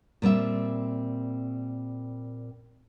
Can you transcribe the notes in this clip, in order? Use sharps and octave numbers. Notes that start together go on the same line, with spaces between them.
A#2 G3 C4 E5